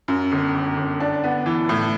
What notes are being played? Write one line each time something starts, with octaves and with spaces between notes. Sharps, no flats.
F#2
G1
G1
G1
D4
B3
E3
A2